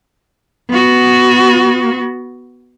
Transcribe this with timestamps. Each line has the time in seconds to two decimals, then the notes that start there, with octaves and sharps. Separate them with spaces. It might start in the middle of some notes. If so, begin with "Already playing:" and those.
0.70 B3 F#4